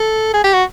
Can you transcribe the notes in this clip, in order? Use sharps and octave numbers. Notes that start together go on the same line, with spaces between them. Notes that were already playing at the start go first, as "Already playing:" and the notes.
Already playing: A4
G#4
G4
F#4